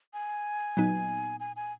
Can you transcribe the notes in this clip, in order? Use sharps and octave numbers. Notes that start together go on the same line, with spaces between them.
G#5
A#2 F#3 B3 D#4
G#5
G#5